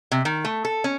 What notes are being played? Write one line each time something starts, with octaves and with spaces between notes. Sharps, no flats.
C3
D#3
A3
A4
C#4